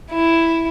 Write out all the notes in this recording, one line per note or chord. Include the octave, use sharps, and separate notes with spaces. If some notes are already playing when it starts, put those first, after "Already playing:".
E4